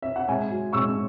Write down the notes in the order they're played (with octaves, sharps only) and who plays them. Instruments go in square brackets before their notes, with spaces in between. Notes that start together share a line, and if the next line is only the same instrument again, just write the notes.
[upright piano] E5
F#5
G#2 E5 G#5
F#3
G#2 C#6 E6